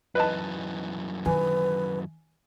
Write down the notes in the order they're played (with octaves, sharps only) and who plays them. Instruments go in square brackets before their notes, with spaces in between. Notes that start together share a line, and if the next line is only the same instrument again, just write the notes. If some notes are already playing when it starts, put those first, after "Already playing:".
[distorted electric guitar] F#2 E3 [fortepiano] B4 D#5 A5
[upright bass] D#3 [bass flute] B4 [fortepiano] G#5